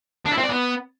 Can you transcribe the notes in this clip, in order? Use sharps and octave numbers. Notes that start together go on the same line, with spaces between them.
D4
E4
C4
D5
B3